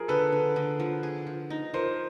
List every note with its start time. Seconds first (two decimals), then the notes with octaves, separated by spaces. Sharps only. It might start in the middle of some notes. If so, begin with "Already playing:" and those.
Already playing: F3 G#4 A#4
0.08 D3 A4 B4
0.32 D3
0.56 D3
0.80 F3
1.03 G#4
1.27 F3
1.50 D#4
1.74 F3 A#4 C5